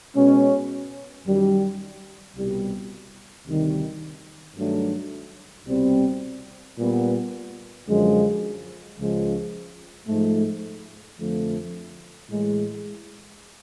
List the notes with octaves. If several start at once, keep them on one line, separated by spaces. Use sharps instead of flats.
B2 G#3 C#4
F#2 D#3 G3
C2 B2 G3
D2 C3 D#3 G3
G2 D#3 F#3 A3 D4
C2 B2 G3 C4
A#2 G3 B3
F#2 D3 F3 G#3
C#2 C#3 F3 G#3
G#2 F3 A3
F2 D3 F3 A3
A2 E3 G#3